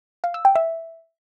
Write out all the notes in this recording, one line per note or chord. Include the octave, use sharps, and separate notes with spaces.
F5
E6
G5
E5